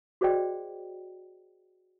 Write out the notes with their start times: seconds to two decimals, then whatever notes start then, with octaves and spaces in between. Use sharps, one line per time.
0.21 F#4 G#4 C5 D5 D#5 G5